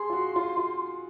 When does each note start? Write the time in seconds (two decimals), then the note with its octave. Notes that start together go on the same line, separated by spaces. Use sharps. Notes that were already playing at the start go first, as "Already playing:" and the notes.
Already playing: G#4 C6
0.10 F4
0.13 F#4
0.36 F4
0.57 F4